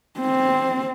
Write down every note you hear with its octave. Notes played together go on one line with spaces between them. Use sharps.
C4